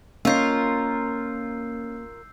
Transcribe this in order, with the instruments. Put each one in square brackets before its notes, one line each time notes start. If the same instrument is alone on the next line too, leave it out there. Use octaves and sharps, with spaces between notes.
[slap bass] A#3 [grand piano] C#4 D#5 [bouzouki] F4 A#4 [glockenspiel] E6 G6 C7